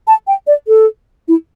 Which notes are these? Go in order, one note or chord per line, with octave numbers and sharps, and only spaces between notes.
A5
G5
D5
A4
E4